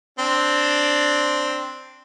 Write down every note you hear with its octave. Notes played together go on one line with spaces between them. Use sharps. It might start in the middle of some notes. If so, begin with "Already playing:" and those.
C4 D4